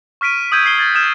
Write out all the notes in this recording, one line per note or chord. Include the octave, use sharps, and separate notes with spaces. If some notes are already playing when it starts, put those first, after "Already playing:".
C#6 F6 B6 D7 D#7
D#6 E6 G6 G#6 D#7
G#6 C7 G7
G#6 A6
D#6 F6 G6 G#6 E7